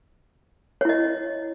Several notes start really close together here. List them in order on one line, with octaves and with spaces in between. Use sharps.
C#5 E4 D#5